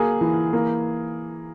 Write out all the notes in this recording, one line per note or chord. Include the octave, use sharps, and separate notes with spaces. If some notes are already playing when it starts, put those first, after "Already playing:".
Already playing: F#3 A#3 G#4
E3
A#3